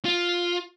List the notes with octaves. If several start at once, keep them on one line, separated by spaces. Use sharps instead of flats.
F4